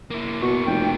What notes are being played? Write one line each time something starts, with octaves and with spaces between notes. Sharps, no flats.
A#3 E4
B2 C#6
F1 G5